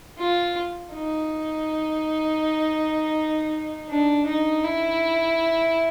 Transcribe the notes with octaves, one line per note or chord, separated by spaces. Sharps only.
F4
D#4
D4
D#4
E4